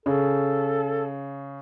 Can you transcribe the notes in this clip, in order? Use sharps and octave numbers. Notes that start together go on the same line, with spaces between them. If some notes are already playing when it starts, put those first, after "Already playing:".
C#3 A4